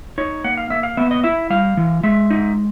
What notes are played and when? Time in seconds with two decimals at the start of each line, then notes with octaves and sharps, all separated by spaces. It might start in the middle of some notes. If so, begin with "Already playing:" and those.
0.18 D#4 C#5
0.44 A#3 F#5
0.57 F5
0.70 A#3 E5
0.83 F5
0.97 B3 E5
1.11 D#5
1.24 E4 E5
1.50 G3 F5
1.77 E3
2.03 G#3 E5
2.30 D#4